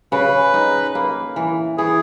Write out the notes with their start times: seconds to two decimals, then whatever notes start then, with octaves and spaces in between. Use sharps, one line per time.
0.12 C#3 B4
0.54 D#4
0.95 A#3
1.36 E3
1.78 E3 G#4